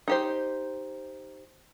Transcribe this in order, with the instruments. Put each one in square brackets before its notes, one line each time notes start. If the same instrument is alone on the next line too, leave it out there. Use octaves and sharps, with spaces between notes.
[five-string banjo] D#4 G4 C5